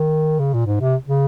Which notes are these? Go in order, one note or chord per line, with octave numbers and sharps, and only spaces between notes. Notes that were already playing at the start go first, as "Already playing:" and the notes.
Already playing: D#3
C#3
A#2
G#2
C3
C#3